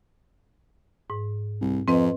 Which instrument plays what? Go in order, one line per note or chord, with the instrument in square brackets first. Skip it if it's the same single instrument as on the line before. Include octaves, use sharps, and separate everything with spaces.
[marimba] G#2
[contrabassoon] C2
[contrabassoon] F2 [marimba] C4 B4 D#5